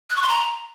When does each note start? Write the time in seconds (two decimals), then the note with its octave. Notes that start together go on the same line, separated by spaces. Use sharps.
0.10 F#6
0.16 C#6
0.22 C6
0.29 A#5